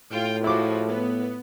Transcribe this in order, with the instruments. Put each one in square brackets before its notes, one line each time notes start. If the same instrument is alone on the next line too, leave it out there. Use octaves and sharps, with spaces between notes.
[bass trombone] A2 [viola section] F4 G5
[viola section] F3 G#3 F#4 [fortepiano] E4 D6
[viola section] B3